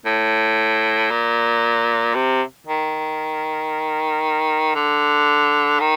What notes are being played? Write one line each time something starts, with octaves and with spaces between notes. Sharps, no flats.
A2
A#2
C3
D#3
D3
D#3